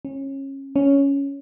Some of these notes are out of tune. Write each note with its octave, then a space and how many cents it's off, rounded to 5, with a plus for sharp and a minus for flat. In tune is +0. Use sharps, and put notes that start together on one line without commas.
C#4 -25
C#4 +5